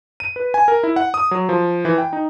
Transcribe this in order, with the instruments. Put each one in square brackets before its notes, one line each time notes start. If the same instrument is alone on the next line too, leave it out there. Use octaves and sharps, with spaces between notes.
[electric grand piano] D#7
B4
G#5
A#4
E4
F#5
D#6
F#3
F3
E3
G5
D#4